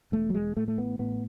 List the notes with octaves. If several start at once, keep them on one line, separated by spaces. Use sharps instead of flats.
E1 A3
F#3
E1 G#3
A2 A3
A3
A1 B3
A2 B3